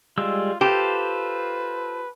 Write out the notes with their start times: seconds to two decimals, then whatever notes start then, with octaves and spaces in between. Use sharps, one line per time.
0.18 G3 G#3 F4 E6
0.61 F4 G4 A4 B4 C5